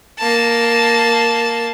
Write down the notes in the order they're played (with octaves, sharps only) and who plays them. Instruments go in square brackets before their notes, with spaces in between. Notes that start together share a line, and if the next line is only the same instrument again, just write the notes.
[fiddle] A#3 A5